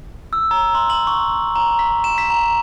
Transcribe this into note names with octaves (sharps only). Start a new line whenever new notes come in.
E6
A#5
C6
F#7
C#6
A#5
B6
E7
B6
A#5